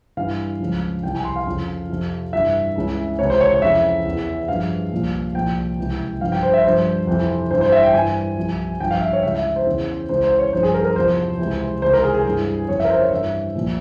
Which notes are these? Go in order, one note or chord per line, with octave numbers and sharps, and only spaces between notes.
G2 E3 F5
C#2 C#3 F3
C2 C3 E3 G5
G#5
C6
F5
F2 C#3 F3
F2 C3 F3
G2 E3 E5
C#2 C#3 E3
C#2 C3 E3 C#5
C5
C#5
C#5
F2 C#3 E3 E5
E2 E3
G2 F3 F5
C2 A#2 F3
C2 A#2 F3 G5
C#2 C3 E3
G2 F3 F5
G5
C5
E5
G2 F3 C5
F2 C3 E3
G2 E3 C5
C5
E5
G5
G2 E3 G#5
C2 C3 F3
G2 F3 G5
F5
E5
C#5
C#2 C#3 E3 E5
E5
C5
E2 C#3 E3
C#2 C#3 E3 C5
C5
C#5
G2 F3 C5
G#4
A#4
A#4
E2 C3 F3 C5
C#2 C3 E3
C#2 C3 E3 C5
A#4
G#4
G#4
G2 E3
F2 C#3 E3 C#5
E5
A#4
C5
C#5
G2 E3 E5
C2 A#2 F3